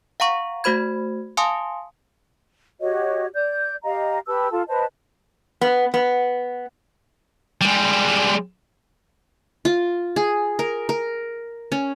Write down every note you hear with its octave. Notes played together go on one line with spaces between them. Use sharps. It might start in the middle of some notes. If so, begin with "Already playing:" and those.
F5 F#5 A#5 C#6
A3 F#4 C5 B5 G#6
F5 G#5 A5 C6 D6 D#6
F#4 G4 C#5 D#5
D5 G6
G4 D#5 F5 A#5
G4 B4 A5 E6
F4 A4 A5
B4 C5 D#5 A5
B3
B3
G3 G#3
F4
G#4
A#4
A#4
C#4